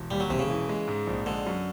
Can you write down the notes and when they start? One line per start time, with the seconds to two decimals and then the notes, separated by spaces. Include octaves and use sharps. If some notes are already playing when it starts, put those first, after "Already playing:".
Already playing: E1
0.11 D#2 G3
0.20 F#3
0.29 E1 C3
0.39 C#3
0.50 E3
0.69 G#3
0.88 G#2
1.07 A#1
1.26 D3 G#3
1.46 F#2